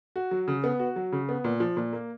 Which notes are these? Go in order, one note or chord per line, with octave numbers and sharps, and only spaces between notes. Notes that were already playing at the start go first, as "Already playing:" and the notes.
F#4
F#3
C#3
B3
F#4
F#3
C#3
B3
A#2
F3
A#2
A#3